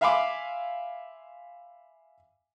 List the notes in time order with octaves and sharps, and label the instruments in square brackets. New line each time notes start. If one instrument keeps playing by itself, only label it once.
[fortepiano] E5 F5 G#5 B5 C6 D6